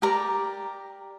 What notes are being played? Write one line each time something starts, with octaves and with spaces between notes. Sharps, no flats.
G4 A#4 D5 A#5